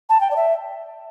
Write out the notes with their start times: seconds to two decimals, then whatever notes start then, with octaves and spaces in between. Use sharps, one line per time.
0.09 A5
0.21 G5
0.31 D5
0.36 E5